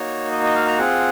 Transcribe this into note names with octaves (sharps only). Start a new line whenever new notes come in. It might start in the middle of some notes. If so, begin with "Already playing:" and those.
Already playing: A#3 D#4 F#4 C#5
D#5
D#5
F5
A#5
C4 F4 G#4 F#5